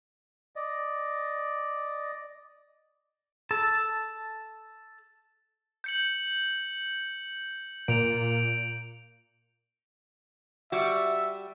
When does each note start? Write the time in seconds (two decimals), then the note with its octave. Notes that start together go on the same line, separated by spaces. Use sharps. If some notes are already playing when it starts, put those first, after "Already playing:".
0.56 D5 D#5
3.51 A4 A5
5.84 G6 C#7 F#7
7.88 A#2 D7 F7
10.72 G3 F#4 E5